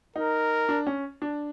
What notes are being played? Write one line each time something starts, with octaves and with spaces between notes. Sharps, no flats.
D#4 A#4
D4
C#4
D4